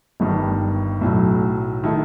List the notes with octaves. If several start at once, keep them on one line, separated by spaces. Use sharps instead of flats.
G1 G2 D#3
B1 A2 F#3
D#3 A3 E4 A4